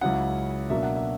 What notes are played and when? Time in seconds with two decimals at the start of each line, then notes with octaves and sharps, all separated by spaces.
0.01 C#2 C#3 F#3 C#4 E4 F#5
0.70 B2 F#3 A#3 D4 E5
0.83 F#5
0.96 E5